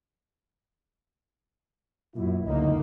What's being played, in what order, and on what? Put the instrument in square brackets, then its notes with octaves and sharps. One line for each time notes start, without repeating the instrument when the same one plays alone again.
[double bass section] F#2 [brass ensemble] A#2 F#3 E4
[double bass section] C#2 A#3 [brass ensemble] D3 D#4